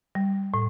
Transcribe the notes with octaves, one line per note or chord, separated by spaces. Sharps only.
G3
A2